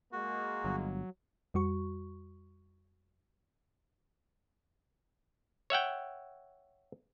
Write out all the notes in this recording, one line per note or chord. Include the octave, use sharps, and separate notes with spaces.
G#3 A#3 F#4
G1 F#3
F2 G3 F#4 C#6
C#5 E5 F#5 G5